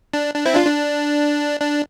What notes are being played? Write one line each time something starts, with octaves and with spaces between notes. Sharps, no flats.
D4
D4
C4 E4
D4 F4
D4
D4